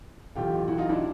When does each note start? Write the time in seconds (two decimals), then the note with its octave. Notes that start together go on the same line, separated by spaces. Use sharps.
0.36 B1 A2 E3 F4 G4
0.68 E4 F#4
0.78 D#4 F4
0.89 D4 E4